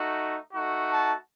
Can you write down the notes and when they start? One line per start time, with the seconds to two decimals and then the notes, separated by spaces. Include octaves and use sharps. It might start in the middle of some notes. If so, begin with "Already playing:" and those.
Already playing: A3 D#4 F#4
0.52 A3 D#4 F#4
0.90 A5